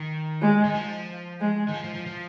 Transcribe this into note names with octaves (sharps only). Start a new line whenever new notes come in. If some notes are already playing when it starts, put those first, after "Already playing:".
Already playing: D#3
G#3
D#3
F3
G#3
D#3
F3
F3
F3
F3